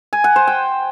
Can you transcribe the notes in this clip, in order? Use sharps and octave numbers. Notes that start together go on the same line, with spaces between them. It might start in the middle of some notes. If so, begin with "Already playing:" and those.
G#5
F#5
C5
G5